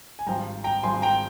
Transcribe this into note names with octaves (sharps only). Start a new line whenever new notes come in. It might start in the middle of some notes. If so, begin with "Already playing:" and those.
G#5
G#1 G2 F3 G5 A#5
G5 A#5
G#1 G2 F3 G#5 C6
G5 A#5